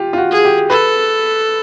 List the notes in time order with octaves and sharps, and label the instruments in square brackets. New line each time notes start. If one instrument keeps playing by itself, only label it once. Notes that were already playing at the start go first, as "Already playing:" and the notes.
Already playing: [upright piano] F4 G4
F4
F#4
[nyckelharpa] G#4
[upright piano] G4
[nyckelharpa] A4 [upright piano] B4